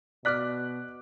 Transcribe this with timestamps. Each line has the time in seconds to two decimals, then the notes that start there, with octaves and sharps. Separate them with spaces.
0.25 B2 D5 D6 F6 F#6 B6